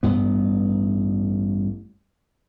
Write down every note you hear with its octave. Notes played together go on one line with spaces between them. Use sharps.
A1 G2 B3